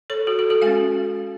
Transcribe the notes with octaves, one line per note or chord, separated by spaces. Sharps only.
A4 C#5
F#4 A4
F#4 A4
F#4 A4
G#3 C#4 F5 G#5